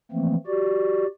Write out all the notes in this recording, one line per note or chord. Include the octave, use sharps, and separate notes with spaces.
E3 F3 A3 A#3 C4
F#4 G4 D5